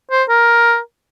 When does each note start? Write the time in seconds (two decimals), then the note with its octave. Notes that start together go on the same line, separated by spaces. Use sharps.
0.11 C5
0.29 A#4